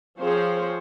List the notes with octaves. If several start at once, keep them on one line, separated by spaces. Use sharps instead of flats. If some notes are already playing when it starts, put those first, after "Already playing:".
F3 C4 G#4 C5 C#5